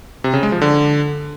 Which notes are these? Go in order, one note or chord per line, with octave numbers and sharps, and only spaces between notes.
C3
C#3
G#3
F3
D3